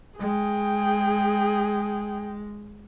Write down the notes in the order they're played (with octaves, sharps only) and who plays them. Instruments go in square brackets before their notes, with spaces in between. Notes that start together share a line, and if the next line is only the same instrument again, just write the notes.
[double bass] G#3 [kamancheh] G#4 G5